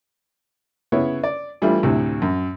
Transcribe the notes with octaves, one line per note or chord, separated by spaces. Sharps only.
C#3 B3 E4 C#5
D5
E3 G3 A3 D4 E4 F4
D2 A2 C3
F#2